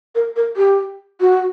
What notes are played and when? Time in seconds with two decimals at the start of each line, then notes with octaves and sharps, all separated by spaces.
0.15 A#4
0.36 A#4
0.57 G4
1.20 F#4